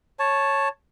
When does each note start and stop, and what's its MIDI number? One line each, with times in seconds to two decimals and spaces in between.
0.19 0.69 73
0.19 0.69 81